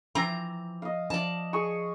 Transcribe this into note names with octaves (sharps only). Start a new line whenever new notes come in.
E3 F3 C4 A#5
D#5 F5
F3 D5 A5
G#4 G#5 C#6